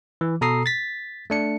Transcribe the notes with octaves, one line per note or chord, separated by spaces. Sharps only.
E3
B2 A4 A#5 D#6 C7
A6 B6
A3 D4 C#7